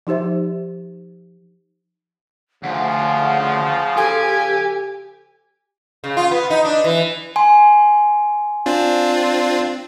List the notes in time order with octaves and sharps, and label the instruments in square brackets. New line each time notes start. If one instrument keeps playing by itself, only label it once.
[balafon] F3 D#4 G4 C5 E5
[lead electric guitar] D2 [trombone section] C#3 F3 [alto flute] F#5
[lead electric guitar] G4 [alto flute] A4 [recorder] G#5
[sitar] C#3
F4
B3
D#4
D4
E3
[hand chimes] G#5 C6
[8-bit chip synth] C4 D4 F4